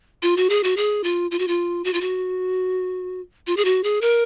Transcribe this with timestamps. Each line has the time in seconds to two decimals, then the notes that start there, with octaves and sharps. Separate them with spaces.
0.22 F4
0.37 F#4
0.50 G#4
0.63 F#4
0.77 G#4
1.04 F4
1.31 F4
1.39 F#4
1.48 F4
1.84 F#4
1.93 F4
2.01 F#4
3.47 F4
3.57 G#4
3.65 F#4
3.83 G#4
4.01 A#4